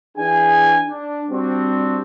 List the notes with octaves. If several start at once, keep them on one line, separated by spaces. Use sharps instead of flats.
E3 D4 G#4 G5 G#5
D4
G3 C4 D4 F#4